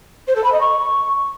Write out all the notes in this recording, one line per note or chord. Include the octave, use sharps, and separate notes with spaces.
C5
A4
B5
D#5
C#6